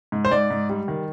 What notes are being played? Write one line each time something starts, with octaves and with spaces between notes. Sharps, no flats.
G#2
C5
G#2 D5
G#2
G3
D#3